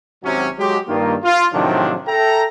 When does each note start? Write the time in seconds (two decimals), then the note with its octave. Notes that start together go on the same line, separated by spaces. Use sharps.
0.24 G#1 C3 F#3 C#4
0.59 F#3 G#3 G4
0.88 G2 D#3 A#3 F4
1.23 F4
1.53 A2 C3 D#3 F3 F#3 D4
2.07 A4 E5 G5 A#5